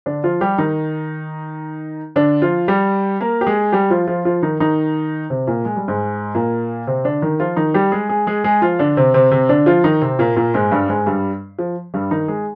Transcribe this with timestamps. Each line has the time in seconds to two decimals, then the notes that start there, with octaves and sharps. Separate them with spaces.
0.06 D3 D4
0.24 F3 F4
0.41 G3 G4
0.58 D#3 D#4
2.16 D3 D4
2.42 F3 F4
2.68 G3 G4
3.21 A#3 A#4
3.41 G4
3.47 G#3 G#4
3.72 G3 G4
3.90 F3 F4
4.08 F3 F4
4.25 F3 F4
4.43 D#3 D#4
4.60 D#3 D#4
5.30 C3 C4
5.47 A#2 A#3
5.65 G#3
5.77 G3
5.88 G#2 G#3
6.35 A#2 A#3
6.87 C3 C4
7.04 D3 D4
7.22 D#3 D#4
7.40 F3 F4
7.56 D#3 D#4
7.74 G3 G4
7.92 G#3 G#4
8.09 G#3 G#4
8.27 G#3 G#4
8.44 G#3 G#4
8.62 F3 F4
8.79 D3 D4
8.97 C3 C4
9.14 C3 C4
9.31 C3 C4
9.49 D3 D4
9.66 F3 F4
9.84 D#3 D#4
10.02 C3 C4
10.19 A#2 A#3
10.36 A#2 A#3
10.54 G#2 G#3
10.72 G2 G3
10.89 G#2 G#3
11.06 G2 G3
11.59 F3
11.94 G2 G3
12.11 D#3 D#4
12.28 G#3 G#4